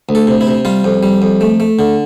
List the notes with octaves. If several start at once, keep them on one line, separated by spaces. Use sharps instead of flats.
D2
A4
C3
E4
C3
G3 F4
F2
G3
F2
A3
A3
D3